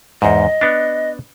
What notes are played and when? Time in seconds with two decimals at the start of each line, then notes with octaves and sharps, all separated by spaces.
0.22 E2 G#2 D#5
0.61 B3 D4